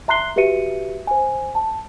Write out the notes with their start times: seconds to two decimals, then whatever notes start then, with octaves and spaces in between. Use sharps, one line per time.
0.08 E5 A#5 C6 F#6 C7 G7
0.36 F#4 G4 B4 E5 C#7 D#7
1.07 C5 G#5
1.55 A5